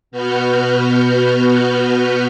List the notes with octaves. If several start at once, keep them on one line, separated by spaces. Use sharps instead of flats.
B2 B3 F#4 B4 F6 G6